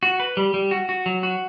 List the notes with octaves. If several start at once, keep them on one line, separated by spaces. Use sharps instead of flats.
F#4
B4
G3
G3
F#4
F#4
F#3
F#4